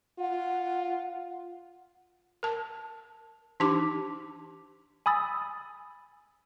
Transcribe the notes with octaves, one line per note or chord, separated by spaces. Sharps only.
F4 F#5
A#4 A5
E3 D4 D#4 G4 A5 D6
G#5 B5 D#6 E6 A6